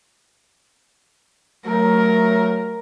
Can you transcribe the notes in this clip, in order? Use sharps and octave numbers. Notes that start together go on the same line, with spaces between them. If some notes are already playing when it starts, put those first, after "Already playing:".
F#3 A3 A#4